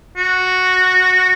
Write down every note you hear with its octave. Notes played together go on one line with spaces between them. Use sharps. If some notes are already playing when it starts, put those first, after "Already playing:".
F#4